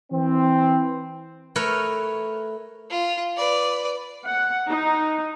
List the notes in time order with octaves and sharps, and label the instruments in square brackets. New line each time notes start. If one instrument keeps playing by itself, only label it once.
[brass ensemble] E3 C4
[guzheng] A3 A#4 B4 C#5
[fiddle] F4
B4 D5
[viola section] F#5
D#4